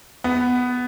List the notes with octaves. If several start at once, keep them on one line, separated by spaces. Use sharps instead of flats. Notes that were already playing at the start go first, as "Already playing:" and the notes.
B3